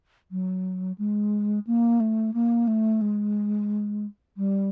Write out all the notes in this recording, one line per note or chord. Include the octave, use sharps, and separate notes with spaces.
F#3
G#3
A#3
A3
A#3
A3
G#3
G3